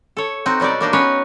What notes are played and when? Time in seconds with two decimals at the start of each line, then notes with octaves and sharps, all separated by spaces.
0.17 A4 C#5
0.46 C4 D#4 F#4
0.60 B2 F#3 G3 F#4 D5
0.81 A#3 D4 D#4
0.93 B3 C#4 B4 C#5